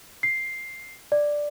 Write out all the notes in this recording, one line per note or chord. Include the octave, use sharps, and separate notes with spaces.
C7
D5